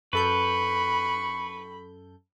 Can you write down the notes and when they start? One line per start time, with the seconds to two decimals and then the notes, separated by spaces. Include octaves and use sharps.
0.13 F#2 A4 B4 B5 C#6 G6